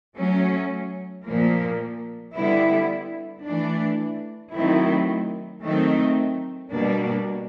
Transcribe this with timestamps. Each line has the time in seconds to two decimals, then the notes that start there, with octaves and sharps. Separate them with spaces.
0.17 F#3 A3 C#4
1.26 A#2 F3 A#3
2.35 D3 G3 B3 E4
3.45 E3 A3 D4
4.53 D#3 F#3 A3 C4 E4
5.63 D#3 F#3 A3 C4 D#4
6.72 B2 G3 A#3 D4